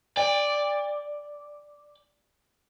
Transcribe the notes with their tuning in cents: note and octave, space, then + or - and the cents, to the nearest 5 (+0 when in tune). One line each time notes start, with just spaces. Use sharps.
D5 +0 G5 +40